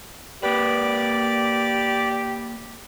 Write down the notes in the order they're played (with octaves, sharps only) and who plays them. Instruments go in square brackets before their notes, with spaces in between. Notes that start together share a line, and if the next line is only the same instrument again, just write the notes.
[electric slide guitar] A#3 B4 [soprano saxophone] G4 [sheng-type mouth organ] D5